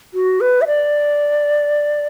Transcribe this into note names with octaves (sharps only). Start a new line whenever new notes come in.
F#4
B4
E5
D5